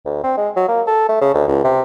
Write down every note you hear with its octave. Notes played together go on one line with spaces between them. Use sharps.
D2
C4
G#3
F#3
A#3
A4
A3
C#3
D2
C#2
C3